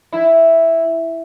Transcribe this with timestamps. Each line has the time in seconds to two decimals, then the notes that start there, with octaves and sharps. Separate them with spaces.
0.13 E4